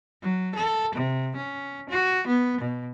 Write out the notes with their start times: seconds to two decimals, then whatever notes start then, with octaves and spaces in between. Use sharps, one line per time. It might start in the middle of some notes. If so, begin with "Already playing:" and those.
0.22 F#3
0.55 A4
0.95 C3
1.36 C#4
1.89 F#4
2.27 B3
2.61 B2